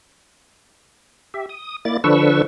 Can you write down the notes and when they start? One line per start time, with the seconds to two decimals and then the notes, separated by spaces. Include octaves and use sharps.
1.34 G4 E5
1.49 D#6
1.85 A#3 E4 D5 A6
2.04 D3 F3 D4 B4 C#6 E6